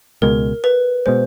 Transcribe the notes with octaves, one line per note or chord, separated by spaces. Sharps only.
C#2 B2 G#3 A#4
B4
B2 G#3 C5